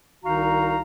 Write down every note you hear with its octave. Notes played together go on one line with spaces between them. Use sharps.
C2 D#3 D#4 F#4 F5 A#5